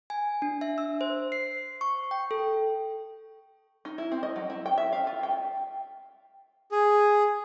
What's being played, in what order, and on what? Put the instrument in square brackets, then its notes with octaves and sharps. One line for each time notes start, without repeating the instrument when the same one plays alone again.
[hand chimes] G#5
D4
E5
E6
C5
C7
C#6
G5
A4
[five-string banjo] D#4
E4
C4
D#5
F#3
E4
G5
E5
F5
F4
G5
[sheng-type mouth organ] G#4